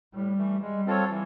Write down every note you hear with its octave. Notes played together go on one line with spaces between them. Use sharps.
A2 G3
E3 A3
G3 G#3
C4 F4 A4 C#5
E3